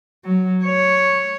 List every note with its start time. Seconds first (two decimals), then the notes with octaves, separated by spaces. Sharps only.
0.25 F#3
0.65 C#5